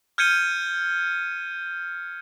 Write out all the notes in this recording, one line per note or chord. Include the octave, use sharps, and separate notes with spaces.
F6 G6 G#6 C#7 D#7 G7